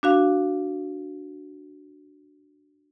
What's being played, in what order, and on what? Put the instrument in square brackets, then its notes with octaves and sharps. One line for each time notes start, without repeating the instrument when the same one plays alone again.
[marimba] D4 F#4 F5